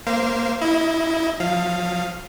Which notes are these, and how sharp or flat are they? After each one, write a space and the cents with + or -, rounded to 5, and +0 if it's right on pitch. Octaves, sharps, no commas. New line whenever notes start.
A#3 +0 C5 +0 F5 -25
E4 -10 D#5 +25
F3 +35 F5 +0